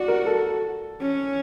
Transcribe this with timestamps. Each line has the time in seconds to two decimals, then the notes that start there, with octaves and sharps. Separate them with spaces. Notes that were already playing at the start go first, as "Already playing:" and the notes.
Already playing: F#4 D5
0.08 A#4
0.26 A4
1.01 C#4